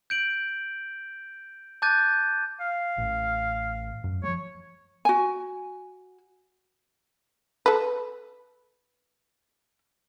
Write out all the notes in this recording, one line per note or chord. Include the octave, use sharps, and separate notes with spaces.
G6 D7 F#7
A5 D6 F#6 G6 A6 D#7
F5
A1
F#2
F3 G#3 C#5
F#4 G#5
A4 B4